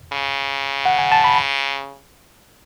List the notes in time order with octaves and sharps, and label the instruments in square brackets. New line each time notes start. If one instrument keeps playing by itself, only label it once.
[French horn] C#3
[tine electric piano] F#5
G#5
A5
B5